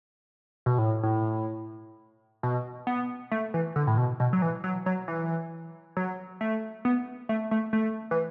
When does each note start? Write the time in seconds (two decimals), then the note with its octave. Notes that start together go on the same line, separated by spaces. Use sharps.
0.66 B2
0.78 A2
1.03 A2
2.43 B2
2.87 B3
3.32 A3
3.54 E3
3.76 D3
3.87 A2
3.97 B2
4.20 B2
4.33 F#3
4.42 E3
4.64 F#3
4.86 F#3
5.08 E3
5.97 F#3
6.41 A3
6.85 B3
7.29 A3
7.51 A3
7.73 A3
8.11 E3